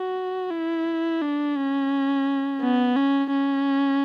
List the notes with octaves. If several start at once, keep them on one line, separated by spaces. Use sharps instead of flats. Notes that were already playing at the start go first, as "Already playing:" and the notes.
Already playing: F#4
E4
D4
C#4
B3
C#4
C#4